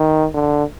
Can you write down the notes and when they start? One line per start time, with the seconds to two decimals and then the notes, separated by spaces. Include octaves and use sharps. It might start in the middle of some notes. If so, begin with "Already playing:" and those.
Already playing: D#3
0.34 D3